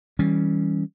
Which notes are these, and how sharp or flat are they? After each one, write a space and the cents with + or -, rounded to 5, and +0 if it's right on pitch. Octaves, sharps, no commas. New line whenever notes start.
E3 -35 G3 +0 C#4 +0